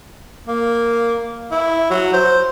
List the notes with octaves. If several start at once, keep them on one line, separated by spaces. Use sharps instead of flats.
A#3
E4
F#3
C5